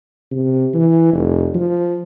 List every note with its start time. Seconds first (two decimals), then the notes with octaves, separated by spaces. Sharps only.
0.32 C3
0.74 E3
1.13 F1
1.55 F3